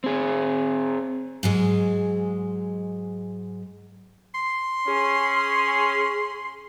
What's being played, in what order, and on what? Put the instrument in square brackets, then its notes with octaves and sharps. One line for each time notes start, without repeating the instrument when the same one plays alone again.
[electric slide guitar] C4 G#4
[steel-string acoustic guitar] G#2 F#3 G#3
[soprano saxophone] C6
[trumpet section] C#4 [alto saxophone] G#4